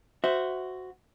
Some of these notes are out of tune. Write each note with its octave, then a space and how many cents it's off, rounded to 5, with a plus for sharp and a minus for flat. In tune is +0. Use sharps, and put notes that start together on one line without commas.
F#4 +0 C5 -15 E5 +0